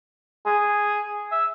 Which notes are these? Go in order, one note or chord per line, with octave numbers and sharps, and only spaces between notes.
G#4
E5